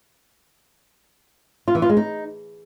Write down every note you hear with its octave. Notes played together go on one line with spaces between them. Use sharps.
F4
E3
F4
G#3
D#4